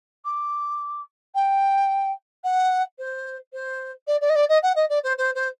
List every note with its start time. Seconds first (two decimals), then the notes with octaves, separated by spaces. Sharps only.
0.25 D6
1.35 G5
2.44 F#5
2.98 C5
3.53 C5
4.07 D5
4.21 D5
4.29 D#5
4.35 D5
4.49 D#5
4.63 F#5
4.76 D#5
4.89 D5
5.04 C5
5.18 C5
5.35 C5